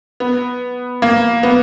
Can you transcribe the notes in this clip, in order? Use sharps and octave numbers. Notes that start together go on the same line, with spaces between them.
B3
A#3
B3